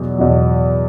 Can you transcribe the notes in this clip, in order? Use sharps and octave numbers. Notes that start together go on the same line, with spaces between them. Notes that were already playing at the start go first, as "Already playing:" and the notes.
Already playing: E2 B2 F#3
E2 B2 F#3